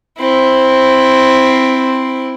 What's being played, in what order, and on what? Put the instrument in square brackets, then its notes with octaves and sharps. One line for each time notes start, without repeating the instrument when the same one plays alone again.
[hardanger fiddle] C4 E4